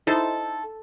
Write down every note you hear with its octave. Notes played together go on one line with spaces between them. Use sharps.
D#4 E4 A4 C5